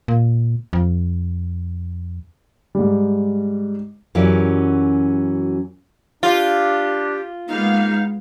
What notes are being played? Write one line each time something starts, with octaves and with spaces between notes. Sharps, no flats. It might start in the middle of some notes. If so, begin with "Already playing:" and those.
A#2
F2
G#2 G3
F#2 E3 C#4 F#4 G4 D5
D4 F4 G4
G#3 A#3 B3 D#4 F5